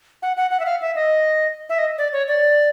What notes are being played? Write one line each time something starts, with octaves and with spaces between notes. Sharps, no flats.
F#5
F#5
F#5
E5
F5
E5
D#5
E5
D#5
D5
C#5
D5